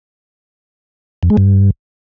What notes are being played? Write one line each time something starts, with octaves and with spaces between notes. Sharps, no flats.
F2
G#3
G2